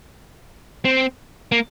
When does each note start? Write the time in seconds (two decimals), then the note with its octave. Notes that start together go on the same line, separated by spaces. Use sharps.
0.85 C4
1.52 A#3